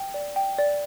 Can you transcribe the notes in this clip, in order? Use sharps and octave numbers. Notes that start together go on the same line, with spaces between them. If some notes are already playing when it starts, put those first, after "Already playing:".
Already playing: G5
D5
G5
D5